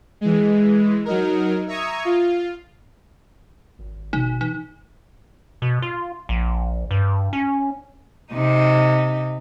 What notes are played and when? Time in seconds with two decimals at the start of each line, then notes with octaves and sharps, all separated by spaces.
0.21 E3 G#3
1.05 F#3 D#4 A#4
1.68 E5 A#5 C#6 D#6 G#6
2.05 F4
3.79 G#1
4.13 B2 D#4
4.41 E3 D#4
5.62 B2
5.82 F4
6.29 A#1
6.91 G2
7.33 C#4
8.33 C3 D#4